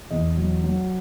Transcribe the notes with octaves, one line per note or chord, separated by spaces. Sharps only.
E2 D#5
F#3
F#3